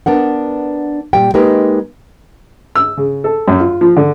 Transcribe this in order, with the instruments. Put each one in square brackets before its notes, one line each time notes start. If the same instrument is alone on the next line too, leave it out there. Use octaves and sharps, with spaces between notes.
[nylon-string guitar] B3 D4 A#4 F#5
A#2 G3 G5
G#3 A#3 D#4 G4 A#4 B4
[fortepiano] E6
C#3
A4
F#2
F4
F3
D3